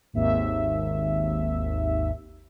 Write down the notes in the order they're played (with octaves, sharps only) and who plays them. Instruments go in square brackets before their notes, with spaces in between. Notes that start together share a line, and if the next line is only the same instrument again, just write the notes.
[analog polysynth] G#1 D#2 E5